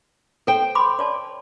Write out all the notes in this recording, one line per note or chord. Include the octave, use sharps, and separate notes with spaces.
A4 C5 G5
B5 C6 D6
C#5 D5 A5